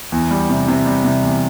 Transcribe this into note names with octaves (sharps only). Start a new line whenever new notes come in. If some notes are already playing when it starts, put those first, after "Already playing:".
E2
G3
C3
C3
G3
C3
E2